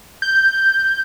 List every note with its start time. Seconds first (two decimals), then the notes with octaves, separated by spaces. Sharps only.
0.22 G6